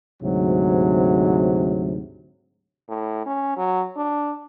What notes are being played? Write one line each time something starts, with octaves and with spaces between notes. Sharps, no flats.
D2 G#2 C3 F#3
A2
C#4
F#3
D4